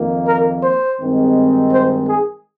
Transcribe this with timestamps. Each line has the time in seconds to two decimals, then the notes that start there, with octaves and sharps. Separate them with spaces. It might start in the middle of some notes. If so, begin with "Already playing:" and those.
Already playing: F2 D#3 A#3
0.27 A#4
0.63 C5
0.99 G2 D#3 G#3 C4
1.72 C5
2.08 G#4